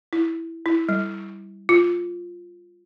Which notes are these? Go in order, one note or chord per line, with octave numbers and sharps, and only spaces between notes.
E4
E4
G3
F4